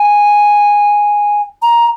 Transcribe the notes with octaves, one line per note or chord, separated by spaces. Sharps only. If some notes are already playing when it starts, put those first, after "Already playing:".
Already playing: G#5
A#5